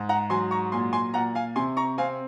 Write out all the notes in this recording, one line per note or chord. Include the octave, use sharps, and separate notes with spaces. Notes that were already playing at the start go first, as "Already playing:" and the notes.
Already playing: G#2
F#5 A#5
F#3 G#5 C6
A#5 C#6
A#2 G#5 C6
G#5 C6
A#2 F#5 A#5
F5 G#5
C3 G#5 C6
A#5 C#6
C4 F5 G#5